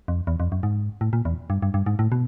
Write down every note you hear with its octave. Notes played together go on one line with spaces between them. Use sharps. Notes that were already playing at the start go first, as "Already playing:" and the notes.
F2
E2
F2
F#2
G#2
A2
A#2
E2
G2
G2
G2
G#2
A2
B2